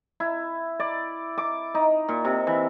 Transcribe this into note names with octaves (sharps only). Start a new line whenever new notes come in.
E4
D5
D6
D#4
A#2
C3
E3